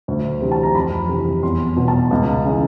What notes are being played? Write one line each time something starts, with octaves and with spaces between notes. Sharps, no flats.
D2
C3 E3
A5
A#5
F2 B5
C3 E3
E2 C6
B2
A5
C#2
C#3 E3